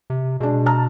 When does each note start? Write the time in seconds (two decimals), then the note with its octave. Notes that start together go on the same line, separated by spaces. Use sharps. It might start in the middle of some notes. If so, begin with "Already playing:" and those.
0.10 C3
0.40 B2 G#3 D4
0.66 A5 A#5 F6